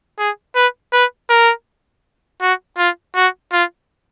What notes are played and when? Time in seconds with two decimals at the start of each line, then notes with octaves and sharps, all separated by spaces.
0.19 G#4
0.56 B4
0.93 B4
1.30 A#4
2.42 F#4
2.78 F4
3.16 F#4
3.52 F4